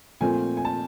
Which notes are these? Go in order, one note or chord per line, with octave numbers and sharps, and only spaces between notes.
A#2 F3 A3 C4 G#5
G#5
A5